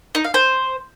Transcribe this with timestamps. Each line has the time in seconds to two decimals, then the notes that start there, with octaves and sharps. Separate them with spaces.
0.15 D#4
0.24 F5
0.34 C5